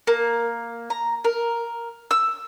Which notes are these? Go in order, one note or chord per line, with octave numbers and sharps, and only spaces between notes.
A#3
A#5
A#4
E6